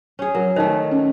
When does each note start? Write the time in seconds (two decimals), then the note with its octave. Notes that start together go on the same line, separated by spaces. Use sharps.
0.19 C#4 G#4
0.35 F#3 A#4
0.56 D#3 A3 D#4 C5
0.92 C#4